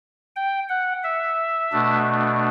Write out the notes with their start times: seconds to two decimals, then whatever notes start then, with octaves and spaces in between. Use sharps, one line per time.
0.36 G5
0.69 F#5
1.04 E5
1.72 B2 A3 D4